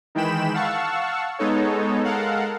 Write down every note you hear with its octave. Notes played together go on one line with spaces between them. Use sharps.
D#3 E3 G#3 G5 B5 E7
F5 F#5 A5 C#6 E6
G#3 B3 D#4 A4 C#5
G#3 A4 A#4 F5 F#5